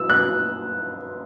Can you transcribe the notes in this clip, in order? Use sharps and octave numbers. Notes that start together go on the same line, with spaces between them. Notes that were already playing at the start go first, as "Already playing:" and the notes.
Already playing: E6
F#6